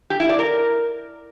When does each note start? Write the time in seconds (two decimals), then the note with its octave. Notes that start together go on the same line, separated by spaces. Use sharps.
0.10 G4
0.20 E4
0.29 D5
0.39 A#4